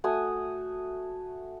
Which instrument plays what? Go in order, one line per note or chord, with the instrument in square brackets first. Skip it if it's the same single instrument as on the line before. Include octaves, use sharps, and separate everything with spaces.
[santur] A3 F#4 G#5 D#6